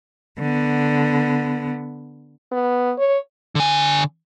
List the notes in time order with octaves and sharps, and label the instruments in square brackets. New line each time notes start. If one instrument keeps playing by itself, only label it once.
[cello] D3 B3
[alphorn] B3
C#5
[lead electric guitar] D3 G#5